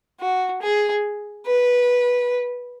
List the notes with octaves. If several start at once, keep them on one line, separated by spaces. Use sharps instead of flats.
F#4
G#4
B4